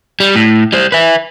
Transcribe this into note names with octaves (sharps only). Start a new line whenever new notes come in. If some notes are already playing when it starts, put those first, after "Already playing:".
G3
A2
G3 C5
B4 E5